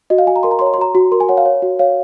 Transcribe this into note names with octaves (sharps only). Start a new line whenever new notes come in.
F#4 D#5
F5
F#4 G#5
A#5
A#4 C6
A#5
C#5 C6
A#5
C6
F#4 A#5
F#4
A#4 C6
G#5
C#5 F#5
F5
C#5
F#4
C#5 F5